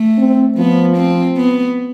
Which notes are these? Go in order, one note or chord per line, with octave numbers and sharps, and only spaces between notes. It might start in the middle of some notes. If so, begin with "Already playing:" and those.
Already playing: A3
C4
F3 B3
C4
B3